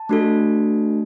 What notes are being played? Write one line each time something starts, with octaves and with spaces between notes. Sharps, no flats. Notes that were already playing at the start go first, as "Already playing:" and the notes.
Already playing: A5
A3 D4 F#4 A4